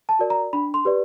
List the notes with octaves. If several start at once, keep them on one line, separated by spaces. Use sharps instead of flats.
A5
F#4 A#4 D5
A#5
D4 B5
C6
G4 B4 D5